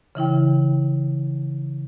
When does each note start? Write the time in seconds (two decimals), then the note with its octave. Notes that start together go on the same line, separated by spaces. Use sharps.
0.15 C#3 E3 E4 G5